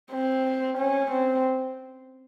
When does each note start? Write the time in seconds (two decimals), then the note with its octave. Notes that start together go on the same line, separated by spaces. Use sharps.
0.11 C4
0.78 C#4
1.11 C4